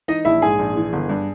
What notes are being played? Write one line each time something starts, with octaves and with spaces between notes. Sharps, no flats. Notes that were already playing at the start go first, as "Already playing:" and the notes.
E3 D#4 D#5
A#1 E4 E5
G#2 G#4 G#5
A#1
E3
G1
G2